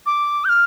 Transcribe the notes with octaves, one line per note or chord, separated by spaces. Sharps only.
D6
G6
F6